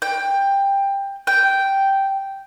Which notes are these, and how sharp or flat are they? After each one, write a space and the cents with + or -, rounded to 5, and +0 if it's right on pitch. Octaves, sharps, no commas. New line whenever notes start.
G5 +15
G5 -5